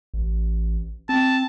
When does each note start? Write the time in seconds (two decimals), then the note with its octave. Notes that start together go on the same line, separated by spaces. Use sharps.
0.14 A1
1.09 C4 A5